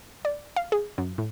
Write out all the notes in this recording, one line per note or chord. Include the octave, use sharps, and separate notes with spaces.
D5
F5
G#4
F#2
A2